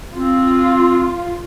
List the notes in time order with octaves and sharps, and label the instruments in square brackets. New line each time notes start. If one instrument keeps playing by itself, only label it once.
[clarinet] C4 [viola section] F4